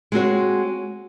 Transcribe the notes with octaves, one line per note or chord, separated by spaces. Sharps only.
G#3 C4 F#4 C#5